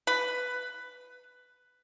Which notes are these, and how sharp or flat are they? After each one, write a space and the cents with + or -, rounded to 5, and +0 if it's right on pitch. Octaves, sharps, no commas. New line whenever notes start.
B4 +10